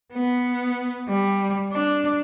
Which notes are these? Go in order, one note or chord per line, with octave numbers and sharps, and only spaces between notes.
B3
G3
D4